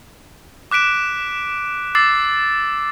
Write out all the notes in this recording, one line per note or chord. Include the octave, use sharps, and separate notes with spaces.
D6 F#6 B6 D7 E7
D6 E6 A6 C7